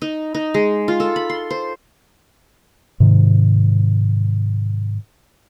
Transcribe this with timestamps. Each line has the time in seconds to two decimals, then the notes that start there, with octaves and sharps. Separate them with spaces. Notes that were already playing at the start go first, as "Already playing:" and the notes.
0.02 D#4
0.34 D#4
0.54 G#3
0.88 F4
1.00 A4
1.16 B5
1.30 C6
1.50 C5
3.00 G#2 C3 D#3